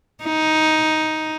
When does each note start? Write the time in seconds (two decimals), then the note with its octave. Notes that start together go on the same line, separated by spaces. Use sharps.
0.24 D#4